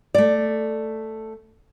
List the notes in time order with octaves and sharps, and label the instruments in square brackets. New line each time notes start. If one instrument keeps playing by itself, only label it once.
[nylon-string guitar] A3 D5